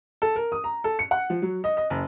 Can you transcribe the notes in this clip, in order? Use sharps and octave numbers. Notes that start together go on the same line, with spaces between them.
A4
A#4
D#6
A#5
A4
C#7
F#5
F3
F#3
D#5
D#5
F#1